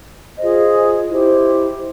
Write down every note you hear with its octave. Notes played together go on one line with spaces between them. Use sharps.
F4 G#4 C5 D#5
E4 G4 C5